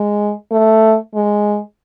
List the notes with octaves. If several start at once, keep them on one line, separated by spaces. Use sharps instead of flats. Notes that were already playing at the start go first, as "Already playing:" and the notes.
Already playing: G#3
A3
G#3